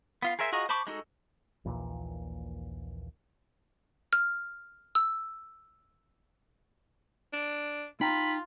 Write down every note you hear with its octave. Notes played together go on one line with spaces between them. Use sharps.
B3 F4 F5
G#4 A#4 C5 E5 G#5
F4 F#4 G#4 D#5 A#5
C5 A5 B5 C#6 D6
G#3 D#4 F#4 A4
A#1 D#2 A#2 E3
F6
E6
D4
D#4 F4 G5 A#5 B5